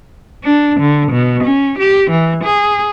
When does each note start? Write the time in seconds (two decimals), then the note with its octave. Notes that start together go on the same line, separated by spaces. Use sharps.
0.44 D4
0.80 D3
1.11 B2
1.43 C#4
1.78 G4
2.10 E3
2.44 G#4